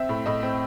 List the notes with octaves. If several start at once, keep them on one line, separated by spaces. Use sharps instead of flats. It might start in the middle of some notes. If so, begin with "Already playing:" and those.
Already playing: C4 E5
A2
A2 D#5
C4